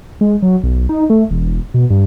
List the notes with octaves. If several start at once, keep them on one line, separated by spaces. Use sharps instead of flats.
G#3
F#3
B1
D#4
A3
E1
B2
G2